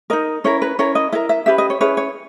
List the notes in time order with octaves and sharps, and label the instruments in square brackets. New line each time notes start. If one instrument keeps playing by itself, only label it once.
[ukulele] D#4 A#4 D#5
C#4 E4 A#4 C#5
B4
C#4 E4 A#4 C#5
D#5
E4 A#4 E5
E5
C#4 G4 B4 E5
D#5
C#5
C#4 E4 G#4 B4 C#5
C#5